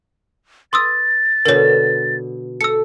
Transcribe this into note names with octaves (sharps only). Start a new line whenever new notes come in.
B4 C6 D#6 E6 A6
B2 D3 A#4 C#5
A4 E6 C#7